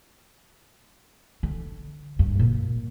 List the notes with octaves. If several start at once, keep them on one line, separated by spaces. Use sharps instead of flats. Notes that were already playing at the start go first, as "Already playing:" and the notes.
D3
G2
A#2 A#3